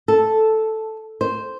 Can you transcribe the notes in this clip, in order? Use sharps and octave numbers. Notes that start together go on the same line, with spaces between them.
A4
C5